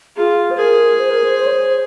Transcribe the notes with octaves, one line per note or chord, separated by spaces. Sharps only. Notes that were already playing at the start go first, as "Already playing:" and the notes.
F4 G#4
C5
G#4 A#4
C5
A#4
C5
C5
C#5
C5